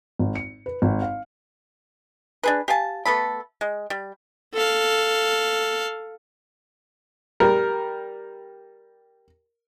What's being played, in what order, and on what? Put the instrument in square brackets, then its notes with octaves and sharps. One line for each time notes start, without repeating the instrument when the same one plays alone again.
[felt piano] G#1
C#7
B4
G#1
F5
[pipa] D4 G#4 B4
G4 F5 G#5 A5
A3 B3 A4 B5
G#3
G3
[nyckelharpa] A4 F5
[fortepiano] G3 A#4